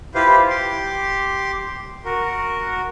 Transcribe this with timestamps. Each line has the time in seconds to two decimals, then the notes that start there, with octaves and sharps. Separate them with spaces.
0.15 E4 F4 G4 B4 C5 F5
0.50 G4 C6 D6
2.05 F#4 A#4